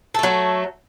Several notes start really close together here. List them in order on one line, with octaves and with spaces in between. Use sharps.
A4 A3 F#3